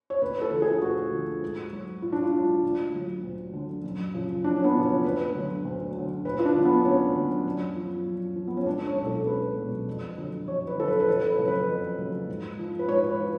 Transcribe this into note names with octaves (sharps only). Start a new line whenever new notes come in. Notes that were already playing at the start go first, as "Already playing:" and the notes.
C#5
D2 B4
A4
D3 F3
G#4
D2 F#4
D3 F3
G#2
F#3
G#2 F4
D4
F4
F#3
D2
D3 F#3
D2
D3 F#3
F#2
C#3 F3
F#2 D4
C#4
B3
C#3 F3
C#4
D2 B4
D3 F#3
D2
D3 F#3
D2 B4
F4
D4
D3 F#3
B3
D2 C#4
D3 F#3
F#2
F3
F#2
F3
B3
C#4
C#2 D4
C#5
B2 F#3
A4
C#2 B4
B2 F#3
F2
D3 F#3
F2 C#5
B4
D3 F#3 A4
B4
B4
F2 A4
B4
C#3 F#3
B4
F2
C#3 F#3
G#2
F3
B4
G#2 C#5
B4
F3